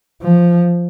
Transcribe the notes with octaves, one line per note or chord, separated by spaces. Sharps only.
F3